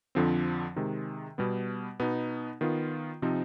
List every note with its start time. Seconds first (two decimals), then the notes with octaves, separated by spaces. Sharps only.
0.15 F2 D3 F3 C4
0.76 C3 D#3 G#3
1.38 B2 G3 B3
2.00 B2 B3 D#4
2.61 D#3 B3 F4
3.22 C3 F3 C4 D#4